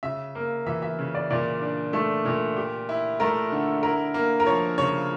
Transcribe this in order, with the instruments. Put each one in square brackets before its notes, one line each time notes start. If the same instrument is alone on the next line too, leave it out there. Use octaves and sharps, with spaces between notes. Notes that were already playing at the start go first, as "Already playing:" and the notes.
[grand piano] C#3 [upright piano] E5
[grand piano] A#3
[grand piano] E3 [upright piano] E5
[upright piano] E5
[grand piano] C#3
[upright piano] D5
[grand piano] A#2 [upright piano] D5
[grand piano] D4
A3
A#2
G4
E4
[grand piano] A3 [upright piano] A#4
[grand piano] D3
[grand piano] E4 [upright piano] A#4
[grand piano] A#3
[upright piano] A#4
[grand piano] F3 [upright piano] C#5
[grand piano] C#3 [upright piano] C#5